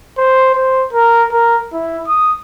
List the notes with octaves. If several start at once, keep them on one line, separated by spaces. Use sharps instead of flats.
C5
C5
A#4
A#4
E4
D#6